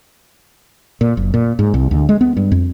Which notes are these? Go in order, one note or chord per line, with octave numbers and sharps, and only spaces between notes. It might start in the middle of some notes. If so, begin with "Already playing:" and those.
A#2
F#1
A#2
G#2
C2
D2
G#3
B3
G2
F2